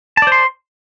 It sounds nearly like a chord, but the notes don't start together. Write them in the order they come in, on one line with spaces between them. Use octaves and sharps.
A5 D5 C5 C6